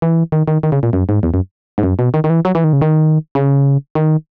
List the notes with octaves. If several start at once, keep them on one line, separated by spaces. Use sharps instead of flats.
E3
D#3
D#3
D#3
C#3
A#2
F#2
G#2
E2
F#2
G#2
F#2
B2
D#3
D#3
E3
F#3
E3
D#3
C#3
D#3
C#3
D#3